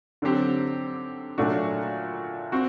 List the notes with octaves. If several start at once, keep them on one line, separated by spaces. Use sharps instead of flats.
D3 F#3 C4 G4
A#2 F#3 A3 D4 F#4
C4 F#4